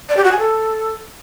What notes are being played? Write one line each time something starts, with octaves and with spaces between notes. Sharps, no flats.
D5
G4
F#4
G#5
A4